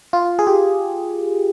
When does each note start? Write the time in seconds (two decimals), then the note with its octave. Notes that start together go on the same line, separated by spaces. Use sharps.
0.13 F4
0.39 G#4
0.47 G4